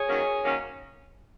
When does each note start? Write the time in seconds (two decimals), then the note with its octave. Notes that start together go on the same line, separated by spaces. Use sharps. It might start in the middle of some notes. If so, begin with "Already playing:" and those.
Already playing: G#4 C#5
0.08 D#3 F#3 A#3 C#4
0.43 D#3 F#3 A#3 C#4